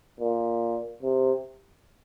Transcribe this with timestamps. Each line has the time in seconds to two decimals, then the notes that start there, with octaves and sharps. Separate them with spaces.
0.20 A#2
1.03 C3